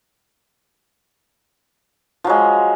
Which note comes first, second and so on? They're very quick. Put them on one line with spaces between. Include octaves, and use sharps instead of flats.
F3 F#3 G#3